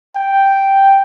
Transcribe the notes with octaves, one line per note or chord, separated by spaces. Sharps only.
G5